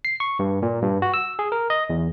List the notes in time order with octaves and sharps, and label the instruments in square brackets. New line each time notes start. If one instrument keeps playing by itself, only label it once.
[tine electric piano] C7
C#6
G2
A#2
G2
F#4
E6
G#4
A#4
D#5
E2